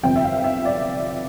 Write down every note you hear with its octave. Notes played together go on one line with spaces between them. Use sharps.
G1 F2 C3 G5
E5
F5
E5
D5